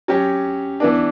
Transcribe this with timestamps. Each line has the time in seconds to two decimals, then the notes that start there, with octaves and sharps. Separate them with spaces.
0.08 F#3 C#4 G4
0.80 E3 B3 D4